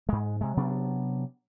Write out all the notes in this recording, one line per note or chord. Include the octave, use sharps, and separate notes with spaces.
G#2 G#3
C3 G#3
C3 F#3 B3 D4